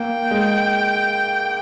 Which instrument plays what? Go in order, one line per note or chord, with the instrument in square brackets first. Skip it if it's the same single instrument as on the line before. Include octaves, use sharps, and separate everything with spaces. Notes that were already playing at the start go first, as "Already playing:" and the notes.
Already playing: [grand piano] A#3 [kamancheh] G5
[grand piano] G#3